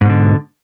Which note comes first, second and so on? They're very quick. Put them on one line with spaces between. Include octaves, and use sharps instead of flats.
G#2 B2 D3